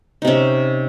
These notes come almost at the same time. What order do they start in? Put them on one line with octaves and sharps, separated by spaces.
D#4 C3 C#4